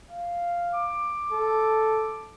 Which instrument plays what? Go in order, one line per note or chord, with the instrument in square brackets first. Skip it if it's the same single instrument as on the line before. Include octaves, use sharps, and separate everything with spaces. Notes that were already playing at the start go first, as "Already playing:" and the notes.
[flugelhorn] F5
[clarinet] D6
[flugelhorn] A4